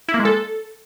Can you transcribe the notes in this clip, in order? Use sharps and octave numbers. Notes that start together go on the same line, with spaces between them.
E4
A#3
G#3
A4